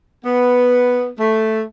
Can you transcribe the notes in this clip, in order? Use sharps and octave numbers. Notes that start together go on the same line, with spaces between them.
B3
A3